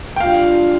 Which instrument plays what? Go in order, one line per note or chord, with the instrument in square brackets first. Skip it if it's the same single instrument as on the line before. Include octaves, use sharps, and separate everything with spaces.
[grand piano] G5
[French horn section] G3 D4 F4 [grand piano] F5